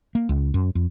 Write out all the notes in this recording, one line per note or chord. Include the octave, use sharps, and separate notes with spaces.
A#3
C#2
F#2
F2